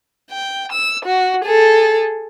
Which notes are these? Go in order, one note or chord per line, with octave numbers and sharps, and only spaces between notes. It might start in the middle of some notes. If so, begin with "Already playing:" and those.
G5
E6
F#4
G#4 A4